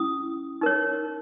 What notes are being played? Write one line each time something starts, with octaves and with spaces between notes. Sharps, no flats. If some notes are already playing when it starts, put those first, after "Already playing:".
Already playing: C#4 E4 D#6
D#4 A#4 C#5